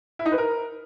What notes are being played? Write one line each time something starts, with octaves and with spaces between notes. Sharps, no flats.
E4
D#4
B4
A#4